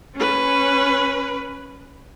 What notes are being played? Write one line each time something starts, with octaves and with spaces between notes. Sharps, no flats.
C#4 B4